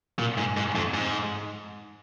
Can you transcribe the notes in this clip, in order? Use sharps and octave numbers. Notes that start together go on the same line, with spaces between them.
A#2
G#2
G#2
F2
G#2